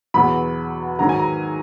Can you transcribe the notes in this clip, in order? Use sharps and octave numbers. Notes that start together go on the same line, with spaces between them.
E2 B2 F#3 B5
G#2 D#3 F#3 A#5
G#5
A#5